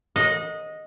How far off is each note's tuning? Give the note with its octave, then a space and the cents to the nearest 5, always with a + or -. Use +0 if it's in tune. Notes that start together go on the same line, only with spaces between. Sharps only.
D#5 +0 F#5 -35